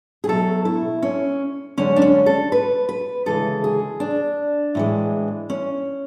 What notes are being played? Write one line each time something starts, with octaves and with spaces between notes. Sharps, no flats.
G#4
B2 F#3 A3 A4
E4
C#4
F#2 D3 G#3 C#4
D4
C#4
A4
B4
B4
D2 C#3 E3 G#3 A4
G#4
D4
A2 E3 G#3
C#4